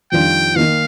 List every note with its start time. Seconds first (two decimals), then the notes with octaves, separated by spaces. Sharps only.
0.12 F2 D#3 G3 D4 F4 G5
0.56 D#3 A#3 D#4 F5